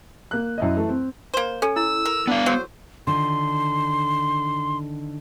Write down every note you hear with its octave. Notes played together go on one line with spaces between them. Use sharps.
A#3 F#6
F#2 E4 D#5
E3 A3
C4
A#3 C5
C#4 A4
E4 E6
A#4
B3 D4 F5
F#3 C5
D3 D#3 F4 C6